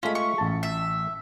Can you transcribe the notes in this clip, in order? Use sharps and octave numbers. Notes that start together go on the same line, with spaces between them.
G#3 A3 C#4 F4 B5
C#6
A1 A5
E5